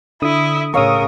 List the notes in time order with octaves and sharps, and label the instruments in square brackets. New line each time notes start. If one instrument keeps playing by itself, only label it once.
[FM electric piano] D3 D#6 [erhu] E4
[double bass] A2 C#3 [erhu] A#4 [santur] C#5 F5 E6 [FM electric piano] C#6 D#6